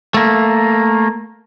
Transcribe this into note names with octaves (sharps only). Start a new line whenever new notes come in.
A3 A#3